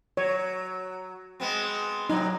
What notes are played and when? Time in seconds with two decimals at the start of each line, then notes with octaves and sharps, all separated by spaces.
0.17 F#3 C#5
1.40 G#3 B3 C4
2.10 A2 C3 F#3 D#4